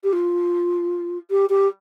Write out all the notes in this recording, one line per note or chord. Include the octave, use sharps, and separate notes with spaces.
G4
F4
G4
G4